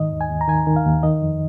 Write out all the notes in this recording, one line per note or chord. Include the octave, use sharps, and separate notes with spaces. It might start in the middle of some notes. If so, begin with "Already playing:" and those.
Already playing: G#2 D#3 D#5
D#2
G#5
D#2
A#5
D#3 G#5
D#3
F5
D#2
D#3 D#5
F2